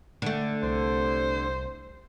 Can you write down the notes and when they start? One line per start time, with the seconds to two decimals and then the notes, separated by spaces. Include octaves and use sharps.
0.22 D3 A3
0.63 C2 C5